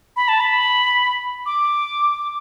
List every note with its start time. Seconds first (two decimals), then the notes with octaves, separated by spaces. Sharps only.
0.16 B5
0.28 A5
0.40 B5
1.46 D6